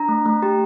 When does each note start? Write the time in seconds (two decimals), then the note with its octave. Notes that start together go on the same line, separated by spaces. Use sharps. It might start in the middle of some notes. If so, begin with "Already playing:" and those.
Already playing: D4 A#5
0.09 A3
0.26 A3
0.42 G4